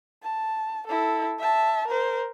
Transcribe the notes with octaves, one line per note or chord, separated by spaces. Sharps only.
A5
E4 A4
E5 A5
A#4 C5